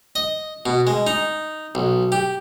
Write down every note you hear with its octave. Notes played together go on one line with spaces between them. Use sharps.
D#5
B2
G#3
D#4
B1
G4